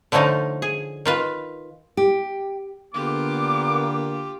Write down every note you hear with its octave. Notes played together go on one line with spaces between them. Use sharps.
D3 F3 A3 C#4 D#4
G#4
D#3 F4 B4
G4
D3 A#3 B3 F4 G4 D6